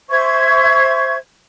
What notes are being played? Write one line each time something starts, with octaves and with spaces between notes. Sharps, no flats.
C5 E5 C#6 G#6